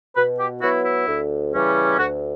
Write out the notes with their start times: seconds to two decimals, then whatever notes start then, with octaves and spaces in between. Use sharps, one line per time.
0.16 B2 B4
0.39 G4
0.62 F#3 B3 E4 F#4
0.84 E4
1.07 D2
1.53 C#3 E3 G3 C#4
1.98 D2 F#4